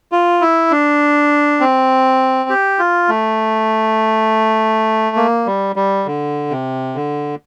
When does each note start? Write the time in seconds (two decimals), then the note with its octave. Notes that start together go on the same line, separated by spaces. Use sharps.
0.12 F4
0.41 E4
0.71 D4
1.60 C4
2.49 G4
2.79 F4
3.09 A3
5.16 A#3
5.46 G3
5.76 G3
6.06 D3
6.50 C3
6.95 D3